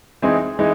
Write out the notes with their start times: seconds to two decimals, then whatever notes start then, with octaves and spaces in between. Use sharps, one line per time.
0.22 E3 G#3 C4 D#4 G#4
0.59 E3 G#3 D#4 G#4